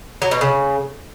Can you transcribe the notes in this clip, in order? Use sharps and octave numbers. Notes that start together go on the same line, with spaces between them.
F#3
B2
C#3